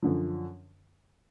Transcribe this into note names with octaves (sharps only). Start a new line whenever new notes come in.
F#2 D3 F3